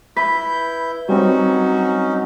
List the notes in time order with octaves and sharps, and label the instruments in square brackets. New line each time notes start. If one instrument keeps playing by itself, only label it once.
[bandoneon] E4 G6 [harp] B4
[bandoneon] F#3 C#4 D#4 [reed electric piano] G3 C4 [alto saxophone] F#4